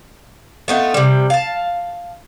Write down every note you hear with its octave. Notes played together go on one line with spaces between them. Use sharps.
A3 B3 D#4 F4
C3 G3
F5 A5